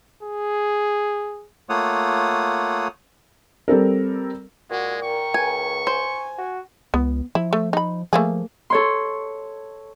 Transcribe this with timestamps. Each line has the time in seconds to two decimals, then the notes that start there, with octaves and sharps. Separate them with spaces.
0.23 G#4
1.69 A3 A#3 F4 C#5 F#5 D#6
3.68 G3 C4 A4 A#4
4.71 A#2 G#3 F#4
5.02 A#4 G5 C#6
5.34 C#2 G#5
5.87 C5 G#5
6.38 F#4
6.94 C#2 B3
7.35 F3 E4
7.53 A3
7.73 D#4 B5
8.13 F3 A3 A#3 G#4
8.70 A4 C#5 C6